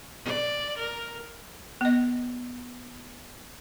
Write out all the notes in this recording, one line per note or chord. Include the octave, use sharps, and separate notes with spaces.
D5
A#4
B3 D#5